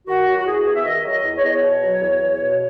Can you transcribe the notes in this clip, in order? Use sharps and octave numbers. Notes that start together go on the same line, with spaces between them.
D#3 F#4
F#3
F#4
E2 G#4
E2
E5
D#3 D#5
F#3
D#5
E2
C#5
E2 D#5
C#5
B2
F#3
E2
E2
B2